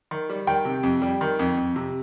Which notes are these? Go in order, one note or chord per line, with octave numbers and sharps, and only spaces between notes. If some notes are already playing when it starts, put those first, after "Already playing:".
D#3
G3
D#3 G5
C3
F2
G3
D#3
F2
F2
C3